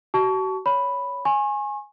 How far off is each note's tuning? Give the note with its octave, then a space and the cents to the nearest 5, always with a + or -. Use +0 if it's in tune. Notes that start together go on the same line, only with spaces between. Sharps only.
F#4 +40 A5 -10 C#6 +25
C#5 +15 B5 +0
G#5 +0 C#6 -40